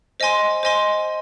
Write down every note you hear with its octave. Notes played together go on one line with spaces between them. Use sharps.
C5 D#5 G#5 C6
C5 D#5 G#5 C6